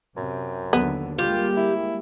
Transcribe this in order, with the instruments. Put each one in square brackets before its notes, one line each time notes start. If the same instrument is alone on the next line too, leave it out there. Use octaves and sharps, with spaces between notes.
[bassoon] F#2 [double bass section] C3
[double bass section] D#2 D3 F#3 [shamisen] B3
[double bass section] G3 G#3 A#3 [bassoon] F4 [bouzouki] G4
[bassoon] E4